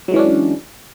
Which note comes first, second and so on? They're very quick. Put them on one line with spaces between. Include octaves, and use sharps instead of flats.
F#3 G#3 E3 C#4 D4